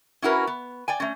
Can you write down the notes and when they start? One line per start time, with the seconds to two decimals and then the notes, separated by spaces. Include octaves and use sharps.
0.22 C#4 E4 F#4 A#4 B4
0.47 B3
0.88 D5 G5 G#5
1.00 A3 C#4